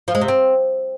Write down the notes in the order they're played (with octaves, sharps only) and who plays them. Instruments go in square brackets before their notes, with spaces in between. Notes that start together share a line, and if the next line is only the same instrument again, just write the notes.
[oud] F3
G#3
C3
C4